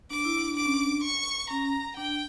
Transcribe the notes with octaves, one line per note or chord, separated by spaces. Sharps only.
D4 D6
E4
D4
D4 D6
C#4
D4
C#6
C#4 A#5
D4 G5